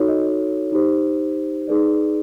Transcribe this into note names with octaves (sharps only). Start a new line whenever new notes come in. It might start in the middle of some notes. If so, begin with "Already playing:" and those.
Already playing: D#4 F#4 A4 C#5
D#5
D#4 G4 C5
D#4 G#4 B4 D5